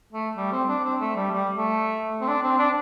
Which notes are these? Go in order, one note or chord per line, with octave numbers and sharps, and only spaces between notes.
A3
G3
C4
D4
C4
A3
G3
G3
A3
C4
D4
C4
D4